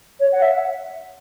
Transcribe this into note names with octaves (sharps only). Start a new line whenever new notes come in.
C#5
F#5
E5